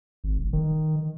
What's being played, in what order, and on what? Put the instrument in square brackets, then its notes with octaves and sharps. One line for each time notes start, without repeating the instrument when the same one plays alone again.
[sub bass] G#1
D#1
D#3